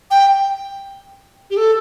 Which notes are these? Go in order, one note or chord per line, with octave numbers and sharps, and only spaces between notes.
G5
G4
A4